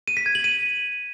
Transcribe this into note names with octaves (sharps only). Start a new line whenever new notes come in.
D#7
B6
G#6
F#7
D#7